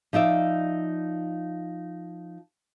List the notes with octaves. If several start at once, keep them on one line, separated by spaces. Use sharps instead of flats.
F3 D#4 D5 E5